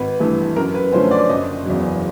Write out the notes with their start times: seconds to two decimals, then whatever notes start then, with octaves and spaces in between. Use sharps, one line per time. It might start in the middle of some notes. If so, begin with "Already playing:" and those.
Already playing: G#1 B4
0.20 G2 E3 A3
0.56 F#2 A#4
0.74 B4
0.92 D3 F3 A3 C#4 C5
1.11 D5
1.29 F#1 D#5
1.65 E2 C#3 F#3